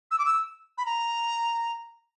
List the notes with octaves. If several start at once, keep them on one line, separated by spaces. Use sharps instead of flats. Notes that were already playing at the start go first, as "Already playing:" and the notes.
E6
D6
E6
B5
A#5